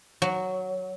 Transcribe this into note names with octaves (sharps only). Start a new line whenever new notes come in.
F#3